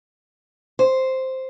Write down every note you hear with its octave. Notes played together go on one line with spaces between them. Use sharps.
C5